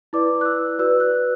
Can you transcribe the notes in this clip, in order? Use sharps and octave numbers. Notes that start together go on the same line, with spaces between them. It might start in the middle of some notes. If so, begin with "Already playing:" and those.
E4 B4 D5 D6
F#6
E6
F#4 B4 D5 E6
F#6